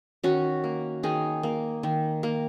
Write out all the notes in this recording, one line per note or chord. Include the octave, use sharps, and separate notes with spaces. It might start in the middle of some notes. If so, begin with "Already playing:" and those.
D#3 C#4 F#4
A#3
D#3 D#4 G#4
A#3
D#3
A#3